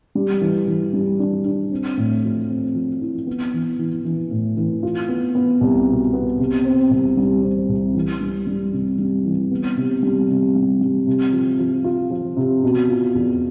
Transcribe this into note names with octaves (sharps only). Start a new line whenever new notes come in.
G3
E3
E3
G3
D4
D4
C4
A2
F3
C4
F3
E4
B3
E3
E3
E3
A2
E3
F4
B3
B3
C2
B2
B3
C3
C4
C2
G3
C4
C2
E3
G3
G3
C3
G3
E3
B3
C3
G3
C3
G3
G3
C3
F3
F3
F4
F3
C3
B2
F4
E2